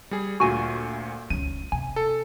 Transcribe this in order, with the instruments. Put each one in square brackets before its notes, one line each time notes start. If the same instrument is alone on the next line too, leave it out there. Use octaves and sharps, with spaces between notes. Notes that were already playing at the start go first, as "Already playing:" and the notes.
[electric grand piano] G3 G#4
[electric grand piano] D2 A#2 [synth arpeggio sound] F#4 G#5
[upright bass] C#2 C#4 [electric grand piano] D#7
[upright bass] C3 [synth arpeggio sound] G#5
[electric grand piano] A4